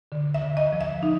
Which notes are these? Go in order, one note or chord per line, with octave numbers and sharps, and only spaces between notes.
D3
E5
D3
D#5
F3
E5
D#4